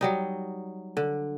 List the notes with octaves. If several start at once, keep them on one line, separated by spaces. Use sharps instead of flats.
F#3 G3 D#4
D3